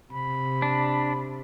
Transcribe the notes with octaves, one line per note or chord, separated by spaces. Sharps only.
C3 B5
D4